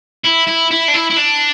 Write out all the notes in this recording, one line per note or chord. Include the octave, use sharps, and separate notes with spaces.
E4
E4
E4
D4
E4
E4
D4